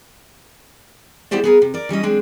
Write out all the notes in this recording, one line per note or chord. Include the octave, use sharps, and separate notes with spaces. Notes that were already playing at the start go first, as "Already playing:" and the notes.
G#3 B3 E4 G4 C5 D5
B3 G#4 A#4
C3
A#4 D5
E3 G3 C#4 D#5
G#3 C4 D4